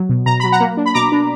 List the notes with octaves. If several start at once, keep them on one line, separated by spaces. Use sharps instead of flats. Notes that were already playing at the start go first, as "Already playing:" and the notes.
Already playing: F#3
B2
B2 A#5
F#3 B5
F#5 A#5
A#3
D4
B5
B2 A#5 D6
D4